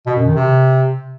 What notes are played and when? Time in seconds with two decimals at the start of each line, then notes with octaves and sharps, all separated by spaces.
0.06 B2
0.16 F#2
0.26 D#3
0.35 C3